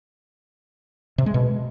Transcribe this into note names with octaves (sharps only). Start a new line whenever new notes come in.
C3
G#3
B2